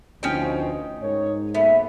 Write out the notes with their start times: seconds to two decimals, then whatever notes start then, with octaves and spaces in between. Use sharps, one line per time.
0.23 D2 B2 F3 C#4 D#4 G5
1.02 G#2 A#4 C#5
1.54 F#2 A#3 B3 A4 E5